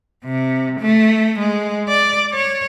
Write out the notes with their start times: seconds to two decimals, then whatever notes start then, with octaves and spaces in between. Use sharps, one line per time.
0.25 C3
0.80 A3
1.39 G#3
1.88 D5
2.33 C#5